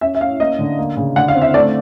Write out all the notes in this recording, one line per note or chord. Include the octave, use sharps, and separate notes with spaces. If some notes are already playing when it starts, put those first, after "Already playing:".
C#4 E5
E5
C#4 F5
A#3 D#5
D3
A#3
C#3
D3 F#5
F5
C4
E5
A3 D5